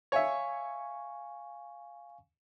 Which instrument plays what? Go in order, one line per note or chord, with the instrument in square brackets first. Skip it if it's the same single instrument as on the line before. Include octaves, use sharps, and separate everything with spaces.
[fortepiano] C#5 E5 [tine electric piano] F5 G#5 C#6